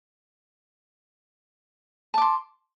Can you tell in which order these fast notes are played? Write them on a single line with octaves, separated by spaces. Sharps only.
A5 D6 C6